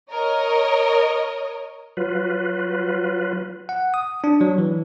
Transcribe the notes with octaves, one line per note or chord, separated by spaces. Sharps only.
A#4 C#5 D#5
F#3 F4 B4
F#5
D#6
D4
F#3
E3